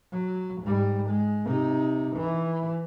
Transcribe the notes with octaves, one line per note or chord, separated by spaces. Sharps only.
F#3
G#2 G3
G#3
C3 D#4
E3